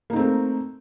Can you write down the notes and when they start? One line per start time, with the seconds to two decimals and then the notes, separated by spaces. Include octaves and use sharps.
0.10 A#3
0.13 D#4
0.16 C4
0.19 A3